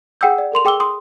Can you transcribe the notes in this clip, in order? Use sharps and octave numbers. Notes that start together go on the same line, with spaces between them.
G#4 F#5 G5 D#6 E6 G6
D5
A4 A#4 C6 F7
G#4 G5 D6 E6 G7
C6 D#6